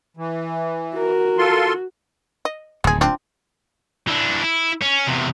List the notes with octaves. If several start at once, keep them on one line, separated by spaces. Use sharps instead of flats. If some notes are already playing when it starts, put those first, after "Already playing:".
E3
F#4 A#4
F4 A4 C6
D#5
D1 D#2 G#3 G#4
C4 D4 F4
E3 D4
E4
C#4
E2 C3